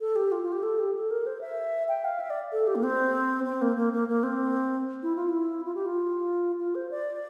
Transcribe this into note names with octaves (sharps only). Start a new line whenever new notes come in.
A4
G4
F4
F4
G4
A4
G4
A4
A#4
C5
E5
G5
F5
E5
D5
A4
G4
A#3
C4
C4
A#3
A#3
A#3
A#3
C4
E4
F4
E4
F4
G4
F4
F4
C5
D5